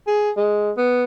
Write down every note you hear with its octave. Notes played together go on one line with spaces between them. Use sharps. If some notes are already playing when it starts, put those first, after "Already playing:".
G#4
G#3
B3